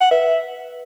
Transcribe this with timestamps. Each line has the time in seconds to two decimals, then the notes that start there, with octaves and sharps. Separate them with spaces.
0.01 F#5
0.11 B4 E5